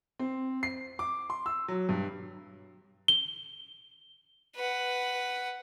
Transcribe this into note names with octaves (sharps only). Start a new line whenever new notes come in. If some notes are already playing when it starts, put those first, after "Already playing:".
C4
C7
D6
C6
E6
F#3
G2
G7
B4 F#5